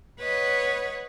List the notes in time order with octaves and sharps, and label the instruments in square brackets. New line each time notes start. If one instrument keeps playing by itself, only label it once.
[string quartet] B4 C#5 D#5 F#5